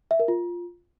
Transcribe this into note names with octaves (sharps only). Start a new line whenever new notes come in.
E5
A#4
F4